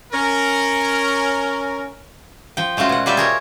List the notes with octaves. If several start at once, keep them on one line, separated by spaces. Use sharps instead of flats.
C#4 A#4
F3 G5
G#3 A3 C#4 F4 F#4
B2 F#5
G3 F4 D5 E5 G5
G#4 A#4 C#5